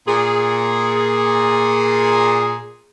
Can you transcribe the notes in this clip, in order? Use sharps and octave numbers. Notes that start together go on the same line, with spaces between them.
A#2 G#4